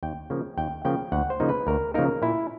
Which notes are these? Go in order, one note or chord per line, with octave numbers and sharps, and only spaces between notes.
D#2 G5
C#3 F3 A#3
D#2 G5
C#3 F3 A#3 G5
D2 F#5
C5
C#3 F3 A#3 D#4
B4
D2 A#4
C#3 F3 A#3 D#4 A#4
A#2 E4